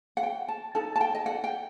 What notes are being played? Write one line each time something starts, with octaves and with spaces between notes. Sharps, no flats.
F#5
G5
A5
D#4 A4 A5
A5
G5
D#5
F#5
G5